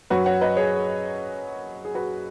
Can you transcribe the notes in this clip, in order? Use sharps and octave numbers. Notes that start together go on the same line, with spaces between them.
F#2 F#3 C#4 F#4 B4
C#5 F#5
B4 D#5
G#4 C#5
G#4
F#4 B4